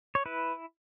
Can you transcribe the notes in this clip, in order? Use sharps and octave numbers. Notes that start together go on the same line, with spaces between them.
C#5
E4 B4